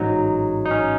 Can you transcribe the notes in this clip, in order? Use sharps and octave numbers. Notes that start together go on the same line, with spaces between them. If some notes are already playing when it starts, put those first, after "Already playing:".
Already playing: A1 G#2 F#3 D#4
D#4
C#4